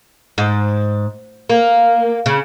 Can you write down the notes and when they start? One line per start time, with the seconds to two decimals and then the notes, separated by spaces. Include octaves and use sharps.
0.38 G#2
1.50 A#3
2.26 C#3